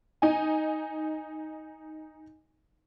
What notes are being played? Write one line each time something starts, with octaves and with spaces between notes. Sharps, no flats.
D#4 G#5